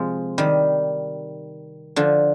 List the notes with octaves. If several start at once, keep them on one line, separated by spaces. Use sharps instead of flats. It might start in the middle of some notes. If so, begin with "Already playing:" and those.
Already playing: C3 F3 G#3
D#3 G3
D3 F3